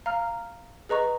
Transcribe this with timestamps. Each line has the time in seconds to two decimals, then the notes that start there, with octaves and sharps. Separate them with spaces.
0.06 F5 A#5 F6
0.89 G#4 B4 D#5 A#5 C#6